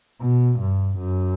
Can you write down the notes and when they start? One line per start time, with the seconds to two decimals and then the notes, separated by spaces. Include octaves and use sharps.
0.21 B2
0.59 G2
0.98 F#2